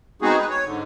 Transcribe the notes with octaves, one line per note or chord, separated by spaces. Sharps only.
G#3 B3 C4 D#4 F#4 G#4
B4
C#5
G#2 D3